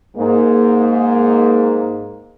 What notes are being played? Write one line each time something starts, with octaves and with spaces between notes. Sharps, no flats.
G#2 A#3